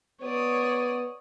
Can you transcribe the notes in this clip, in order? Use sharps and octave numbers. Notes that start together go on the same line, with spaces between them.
B3 C#5 D5 D#6